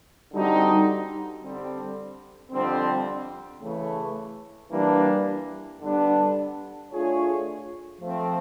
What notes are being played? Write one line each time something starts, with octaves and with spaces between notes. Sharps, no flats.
D3 G3 C4 D#4 F#4
D3 G3 C4
F2 D3 G3 C4
C#3 E3 A3
E3 G3 A#3 D4
D3 G3 B3 D4
A3 D4 F4 G#4 C#5
F3 A3 C4